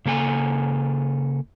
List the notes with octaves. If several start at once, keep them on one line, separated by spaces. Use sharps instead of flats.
C#3 A#3 A4 G#5